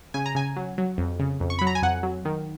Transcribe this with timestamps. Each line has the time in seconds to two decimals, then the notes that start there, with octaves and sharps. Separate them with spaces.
0.14 C#3 G#5
0.26 A#5
0.35 C#3 G#5
0.56 F#3
0.78 F#3
0.98 F2
1.19 C#3
1.40 F2
1.50 C#6
1.59 F#3 B5
1.67 A#5
1.75 G#5
1.82 F2 F#5
2.03 F#3
2.25 D#3